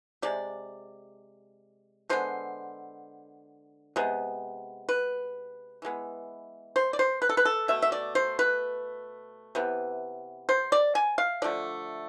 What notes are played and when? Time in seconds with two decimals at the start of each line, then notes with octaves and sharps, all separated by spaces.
0.22 C3 G#3 D5
2.09 D3 G#3 B3 C5
3.96 C3 G#3 B3
4.89 B4
5.82 E3 G#3 B3
6.76 C5
6.93 D5
6.99 C5
7.22 B4
7.29 A4
7.37 B4
7.45 A4
7.68 B2 A3 E5
7.82 E5
7.92 D5
8.15 C5
8.39 B4
9.55 C3 E3 B3
10.49 C5
10.72 D5
10.95 G#5
11.18 F5
11.42 D3 F3 A3 D5